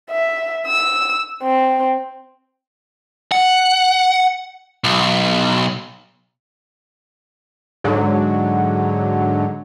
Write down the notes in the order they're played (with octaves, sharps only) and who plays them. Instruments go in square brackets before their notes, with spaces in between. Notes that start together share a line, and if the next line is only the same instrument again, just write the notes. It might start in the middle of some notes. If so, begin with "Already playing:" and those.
[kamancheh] E5
E6
C4
[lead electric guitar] F#5
B1
[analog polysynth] G#2 D3 F#3